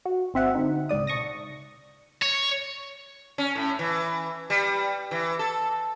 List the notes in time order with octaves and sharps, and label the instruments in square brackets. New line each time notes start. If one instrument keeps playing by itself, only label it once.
[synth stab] F#4
G#1 C4 E5 F#5
D3 C4 D#4
C#2 G#2 D5 D#6
B1 A5 C#6 D#6 A#6
[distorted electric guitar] C#5
[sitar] C#4
A2
E3
G3
E3
A4